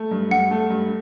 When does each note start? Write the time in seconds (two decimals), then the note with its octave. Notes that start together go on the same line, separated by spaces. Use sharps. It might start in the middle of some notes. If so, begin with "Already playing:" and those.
Already playing: A3
0.11 G2
0.31 G2 F#5
0.51 A3
0.70 G2